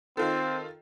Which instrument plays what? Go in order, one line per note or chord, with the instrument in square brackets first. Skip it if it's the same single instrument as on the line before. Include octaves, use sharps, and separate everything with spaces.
[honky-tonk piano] D#3 F4 A4 [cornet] C4